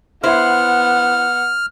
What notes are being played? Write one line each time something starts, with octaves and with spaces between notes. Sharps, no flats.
B3 E4 C5 F#5 F6